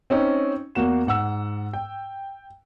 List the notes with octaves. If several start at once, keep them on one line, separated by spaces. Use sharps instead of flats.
C4 C#4 D#4
E2 A#3 F#4 E7
G#2 F#5 E6
G5